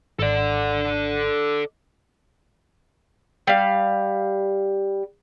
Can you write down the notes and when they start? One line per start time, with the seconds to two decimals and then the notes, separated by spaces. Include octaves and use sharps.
0.19 G#1 A4 D5
3.47 G3 F5